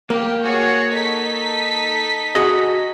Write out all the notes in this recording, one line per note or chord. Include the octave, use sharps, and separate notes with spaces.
A#3 G4
F#4 G#4 C#5
D#4 A4 B6
F#4 G#4 D#5